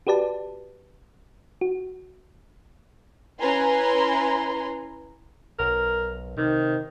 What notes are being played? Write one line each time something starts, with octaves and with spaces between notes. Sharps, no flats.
F#4 G4 B4 D5 A5
F#4
C#4 E4 B4 G#5 A#5 C6
B1 A#4
C3 D#3